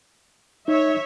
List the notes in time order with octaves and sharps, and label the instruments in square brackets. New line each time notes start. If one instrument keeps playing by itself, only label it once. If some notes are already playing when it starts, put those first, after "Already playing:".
[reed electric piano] D#4 [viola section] C#5 E5